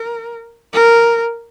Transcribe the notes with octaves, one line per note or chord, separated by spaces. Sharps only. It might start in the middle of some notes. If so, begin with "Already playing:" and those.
Already playing: A#4
A#4